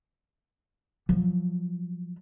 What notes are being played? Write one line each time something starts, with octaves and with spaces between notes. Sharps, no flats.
F3 F#3